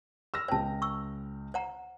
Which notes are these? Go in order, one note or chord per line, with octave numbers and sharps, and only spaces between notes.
E6 F6 A#6
C#2 C5 G5 A5
C#6 E6
C5 F#5 A#5